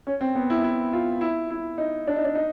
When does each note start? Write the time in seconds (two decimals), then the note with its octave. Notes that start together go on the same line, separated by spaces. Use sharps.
0.07 C#4
0.21 C4
0.35 B3
0.50 E4
0.64 E4
0.93 F4
1.21 E4
1.50 E4
1.78 D#4
2.07 D4
2.16 D#4
2.25 D4
2.35 D#4